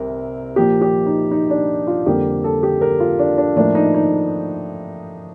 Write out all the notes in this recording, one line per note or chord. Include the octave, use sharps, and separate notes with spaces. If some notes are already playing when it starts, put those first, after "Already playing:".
Already playing: C2 C3 A#4
A#2 F3 A#3 G4
G4
D#4
D#4
D4
F4
F2 D3 G3 A#3 G4
A4
G4
A#4
F4
D4
D4
A2 F3 A#3 D4
D#4
D#4